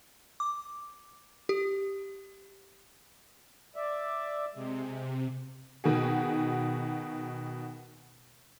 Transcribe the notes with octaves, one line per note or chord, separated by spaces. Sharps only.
D6
G4
D5 E5
C3 G#3
B2 D#3 F#4 G#4